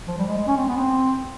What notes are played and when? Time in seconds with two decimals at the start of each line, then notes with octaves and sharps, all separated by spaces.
0.08 F3
0.18 G3
0.28 G#3
0.38 G#3
0.47 C#4
0.57 C4
0.68 B3
0.77 C4